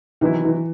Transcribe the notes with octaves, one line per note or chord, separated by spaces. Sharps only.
C3 D#3 E3 F#3 B3 E4
E3